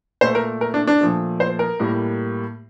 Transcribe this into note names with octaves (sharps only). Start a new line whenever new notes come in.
A#2 A3 C5
A#4
A#4
D4
D4
A#2 F3 A3
C5
A#4
A2 G3 A#3